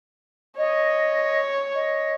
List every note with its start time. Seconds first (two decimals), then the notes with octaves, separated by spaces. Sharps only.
0.57 C#5 D#5
1.74 D#5